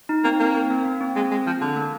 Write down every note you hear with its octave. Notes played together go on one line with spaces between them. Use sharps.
D#4
A#3 C4
A#3
C4
A#3
A#3
C4
G#3 C4
G#3
F3
D3
A#3